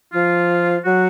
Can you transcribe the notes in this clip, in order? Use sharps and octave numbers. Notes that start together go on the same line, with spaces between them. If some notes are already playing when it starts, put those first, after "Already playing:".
F3 F4
F#3 F#4